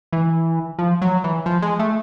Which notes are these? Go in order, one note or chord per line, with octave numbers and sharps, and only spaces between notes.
E3
F3
F#3
E3
F3
G#3
A3